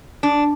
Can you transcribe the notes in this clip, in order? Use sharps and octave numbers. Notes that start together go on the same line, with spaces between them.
D4